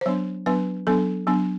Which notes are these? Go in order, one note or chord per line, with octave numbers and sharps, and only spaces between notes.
C5
F#3 B3 D4 C#5
F#3 B3 D4 B4
F#3 B3 D4 A4
F#3 B3 D4